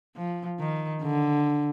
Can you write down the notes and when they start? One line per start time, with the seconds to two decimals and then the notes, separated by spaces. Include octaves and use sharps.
0.16 F3
0.59 D#3
1.02 D3